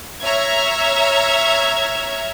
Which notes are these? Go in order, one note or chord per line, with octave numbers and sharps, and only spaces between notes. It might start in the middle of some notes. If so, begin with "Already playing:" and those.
C#5 E5 A#5 F6 G#6